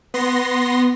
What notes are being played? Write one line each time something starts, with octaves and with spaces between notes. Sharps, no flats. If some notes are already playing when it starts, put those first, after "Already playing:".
B3 C6 A#6